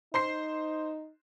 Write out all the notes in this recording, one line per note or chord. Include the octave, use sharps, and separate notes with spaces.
D#4 C5 C6 C7